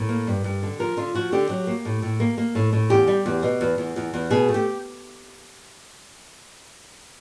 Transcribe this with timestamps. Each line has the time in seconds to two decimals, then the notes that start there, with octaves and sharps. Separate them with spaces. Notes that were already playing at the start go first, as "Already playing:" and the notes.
Already playing: A2 A#4
0.09 A#3
0.27 G2
0.44 G2
0.63 D3
0.79 F3 A#4
0.97 D3 F4
1.14 F3 F#4
1.32 D3 G4
1.50 F#3
1.67 A#3
1.85 A2
2.02 A2
2.20 A#3
2.38 A#3
2.55 A2
2.73 A2
2.90 E2 G4
3.07 G3
3.26 E2
3.43 B2
3.61 E2
3.78 E2
3.96 E2
4.13 E2
4.30 B2 G#4
4.49 A3
4.54 G4